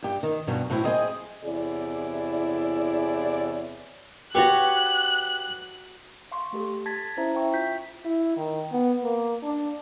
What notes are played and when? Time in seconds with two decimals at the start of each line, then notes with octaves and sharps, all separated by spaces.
0.03 G2 G4
0.23 D#3
0.47 G2 B2 F#3
0.70 A2 F#3 C4 E4
0.84 C4 G#4 D#5
1.43 E2 C3 E4 G#4 C#5 D5
4.35 F#4 G4 B4 C#5 C#6 F#6
6.32 F5 C6 C#6
6.53 A3 G4 A4
6.86 A5 G#6 A6 B6
7.17 C#4 E4 C5 E5 A#5
7.35 E5 G5 C#6
7.54 F4 G6 B6
8.05 E4
8.36 D#3
8.72 B3
9.04 A#3
9.43 D4